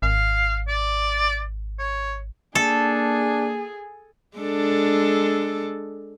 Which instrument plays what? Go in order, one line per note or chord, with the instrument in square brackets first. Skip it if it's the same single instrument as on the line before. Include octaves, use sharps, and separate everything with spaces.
[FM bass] G#1 [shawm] F5
[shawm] D5
C#5
[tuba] A#3 [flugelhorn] D4 [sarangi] G#4 [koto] A4
[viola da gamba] G#3 D4 A4